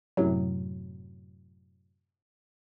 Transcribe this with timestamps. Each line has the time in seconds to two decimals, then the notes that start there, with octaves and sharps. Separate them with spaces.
0.17 F#2 A2 C3 F#3